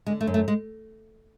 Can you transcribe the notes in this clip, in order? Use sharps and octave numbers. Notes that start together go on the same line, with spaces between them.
D3 G#3
A3
F#2
A3
G#3